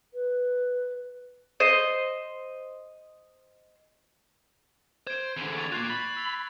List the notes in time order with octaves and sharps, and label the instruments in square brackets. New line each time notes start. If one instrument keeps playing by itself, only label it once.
[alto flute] B4
[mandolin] C5 D#5
[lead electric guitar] C5 [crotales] G#6 D7
[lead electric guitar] E2 D3
[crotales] C#6 A6 F7
[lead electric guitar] A#3 F4 [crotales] F#6 C7
[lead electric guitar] B5 [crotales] A6
[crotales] E6 F7